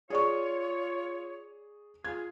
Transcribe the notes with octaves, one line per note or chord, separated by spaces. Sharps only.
F4 G#4 C#5 D5 C#6
F4 G#4 G#6